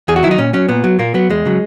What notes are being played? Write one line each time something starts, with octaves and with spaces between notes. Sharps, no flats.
E2 G#4
F#4
D#3 F#3 E4
D#4
A#2 C#4
F#3 C#4
A#2 B3
F#3
A#2 A#3
F#3 B3
E2 G#3
C#3 F#3